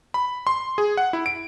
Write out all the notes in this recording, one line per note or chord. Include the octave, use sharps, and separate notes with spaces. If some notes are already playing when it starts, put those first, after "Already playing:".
B5
C6
G#4
F#5
E4
D7